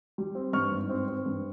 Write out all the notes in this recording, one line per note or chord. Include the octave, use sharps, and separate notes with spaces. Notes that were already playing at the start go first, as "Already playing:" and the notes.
G3
C4
G2 C#6 F6
G#1
C4
C4
G2